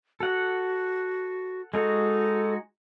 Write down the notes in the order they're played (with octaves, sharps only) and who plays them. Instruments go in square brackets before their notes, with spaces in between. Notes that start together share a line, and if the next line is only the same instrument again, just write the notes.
[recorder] F#4 [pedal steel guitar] A4 F#5
[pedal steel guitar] G#3 D#4 F#4 [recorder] A4